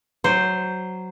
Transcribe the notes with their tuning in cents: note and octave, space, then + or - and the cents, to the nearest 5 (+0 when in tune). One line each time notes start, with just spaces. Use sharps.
F#3 +5 C5 +0